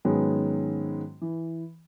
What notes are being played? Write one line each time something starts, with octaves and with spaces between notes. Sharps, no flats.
G#2 D#3 F#3 G#3 B3 C#4
E3